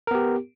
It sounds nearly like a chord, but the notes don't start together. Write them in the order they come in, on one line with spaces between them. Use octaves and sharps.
A#4 B3 G4